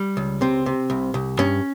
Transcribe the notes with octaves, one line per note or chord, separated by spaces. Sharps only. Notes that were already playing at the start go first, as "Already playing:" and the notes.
Already playing: G3
C#2
C3 C4
C3
C2
C2
G2 C#4